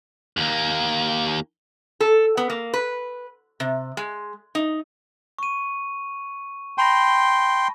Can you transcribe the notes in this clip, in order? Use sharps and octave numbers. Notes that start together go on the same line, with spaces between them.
D#2 A#3
A4
B3
A#3
B4
C3
G#3
D#4
C#6 D#7
G5 A5 B5 C6 A#6